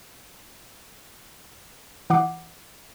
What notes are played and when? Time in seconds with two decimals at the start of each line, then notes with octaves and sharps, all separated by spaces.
2.10 E3 F#5 D6 C7